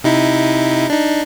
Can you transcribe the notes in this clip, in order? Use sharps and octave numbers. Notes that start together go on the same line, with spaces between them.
C3 D#4 E4
D4 D#4